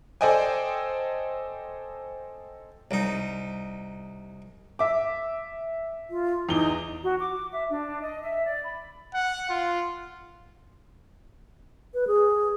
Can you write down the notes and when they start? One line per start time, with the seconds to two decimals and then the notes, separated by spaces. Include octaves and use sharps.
0.21 A4 C5 D5 D#5 G5 G#5
2.91 C2 D#4
4.79 E5 D6
6.10 F4
6.49 E2 D#4 G7
7.02 F#4
7.20 D6
7.52 E5
7.69 D4
8.01 D#5
8.23 E5
8.46 D5
8.64 B5
9.14 F#5
9.50 F4
11.94 B4
12.07 G#4